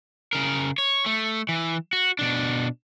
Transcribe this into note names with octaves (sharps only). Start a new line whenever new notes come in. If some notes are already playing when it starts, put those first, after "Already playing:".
C#3 A#4
C#5
A3
E3
F#4
B2 D4